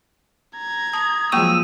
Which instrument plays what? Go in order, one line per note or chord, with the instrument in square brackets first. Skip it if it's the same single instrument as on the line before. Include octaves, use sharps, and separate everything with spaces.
[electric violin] A#5 G#6
[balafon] A5 [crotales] D#6
[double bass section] F3 F#3 G#3 [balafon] A#3 G5 C#6 [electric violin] E6 [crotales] D#7